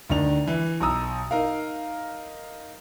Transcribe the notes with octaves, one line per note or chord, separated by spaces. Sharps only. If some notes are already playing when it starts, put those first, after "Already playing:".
D2 D#3 D4 F7
E3
B1 A#5 D#6 E6
D#4 A#4 F5